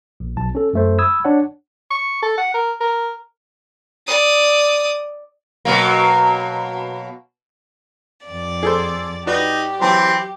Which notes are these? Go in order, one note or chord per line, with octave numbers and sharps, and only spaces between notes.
A#1
B1 A5
C#4 A4
F#2 A3 C5
B5 D#6 E6 G#6
D4 C#5 F#5
C#6
A4
F#5
A#4
A#4
D5 D#6
B2 F#3 A#3
F2 D5 A6
G#4 A4 C5
D#4 F#4 G4 B4 D5
E3 F#3 C4 C6